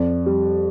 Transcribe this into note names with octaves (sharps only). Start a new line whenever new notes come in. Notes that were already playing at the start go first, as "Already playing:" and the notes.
Already playing: F2 D5
G3